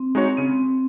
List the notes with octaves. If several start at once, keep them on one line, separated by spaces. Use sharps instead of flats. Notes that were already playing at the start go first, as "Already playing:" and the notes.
Already playing: C4
G#3 D#4 F#4 C#5
C#3 C4